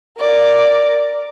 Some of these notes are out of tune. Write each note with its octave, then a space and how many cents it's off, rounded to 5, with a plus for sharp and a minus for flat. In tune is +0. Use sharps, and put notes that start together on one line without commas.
A#4 -5 D5 +0